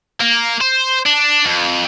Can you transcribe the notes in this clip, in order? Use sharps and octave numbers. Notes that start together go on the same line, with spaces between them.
A#3
C5
D4
F2